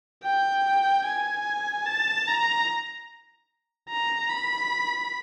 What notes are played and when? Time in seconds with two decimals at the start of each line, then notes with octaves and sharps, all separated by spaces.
0.24 G5
1.05 G#5
1.86 A5
2.27 A#5
3.89 A#5
4.30 B5